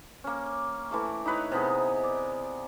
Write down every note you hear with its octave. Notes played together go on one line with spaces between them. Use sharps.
A#3 C#4
E3 A3 D6
D#4 E4 B4 C#5
C3 B3 G#4
D5